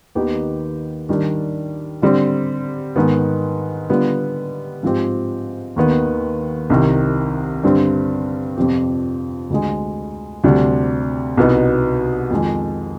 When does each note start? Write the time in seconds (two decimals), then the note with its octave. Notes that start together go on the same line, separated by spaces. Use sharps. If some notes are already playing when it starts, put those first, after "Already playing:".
0.15 D#2 D#3 B3 D#4 G4
1.09 D#3 G3 D4
2.02 D3 G3 C4
2.96 G#2 D#3 B3
3.90 D3 G3 B3 F4
4.83 G#2 F3 C4 G4
5.76 D#2 D#3 B3
6.70 C2 C3 D#3
7.64 G2 D3 G3 C4
8.57 F2 C3 F3 C4 G4
9.50 D2 D3 G#3
10.44 D2 C3 G3 D4
11.37 C2 B2 B3 D#4
12.31 F2 D#3 G#3